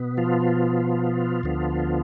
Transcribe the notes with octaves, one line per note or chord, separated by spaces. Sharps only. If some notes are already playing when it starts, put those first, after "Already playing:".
Already playing: B2 B3
F3 F4
D2 D3 F3 B3